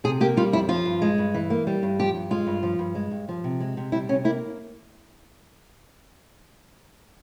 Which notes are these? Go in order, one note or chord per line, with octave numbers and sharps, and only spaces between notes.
C3 G#4
A#3 G4
G3 F4
F2 E4
F3 F4
G2
G#3
G2
E3
A#3
G3
G2
F3 G4
G2
G#3 F4
G2
F3
G2
G#3
G2
F3
C3
G#3
C3
G3 E4
C3 C#4
A#3 E4